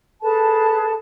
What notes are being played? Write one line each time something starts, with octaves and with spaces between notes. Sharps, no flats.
G#4 A4 B4 A5